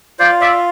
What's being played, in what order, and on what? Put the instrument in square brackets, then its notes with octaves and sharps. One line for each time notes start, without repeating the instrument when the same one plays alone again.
[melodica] F4 C5 D5
D5 E5